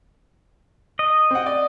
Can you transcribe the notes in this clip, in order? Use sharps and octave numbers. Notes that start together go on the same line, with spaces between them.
D#5
C4 F#5
D5